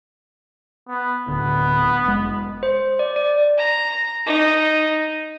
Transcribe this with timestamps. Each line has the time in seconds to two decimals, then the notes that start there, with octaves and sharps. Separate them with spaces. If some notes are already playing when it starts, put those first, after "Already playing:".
0.89 B3
1.28 D1 D3 B3
2.06 F1 G#3
2.63 C5
2.99 D5
3.16 D5
3.58 A#5
4.26 D#4